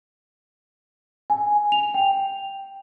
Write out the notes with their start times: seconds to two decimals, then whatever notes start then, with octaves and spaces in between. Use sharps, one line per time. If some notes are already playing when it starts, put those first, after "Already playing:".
1.30 G#5
1.72 F7
1.94 G5